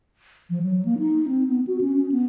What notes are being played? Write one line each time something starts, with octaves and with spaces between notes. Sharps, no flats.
F3
F#3
A#3
D#4
C4
B3
F#4
C#4
C#4
B3